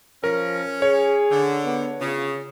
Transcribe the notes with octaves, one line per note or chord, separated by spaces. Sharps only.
F3 C#4 A#4
G#4 C#5
D3
B3
C#3 F4